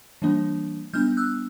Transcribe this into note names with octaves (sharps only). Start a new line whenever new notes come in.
E3 G3 A#3 D4
G3 B3 D4 F6 G6
E6 F#6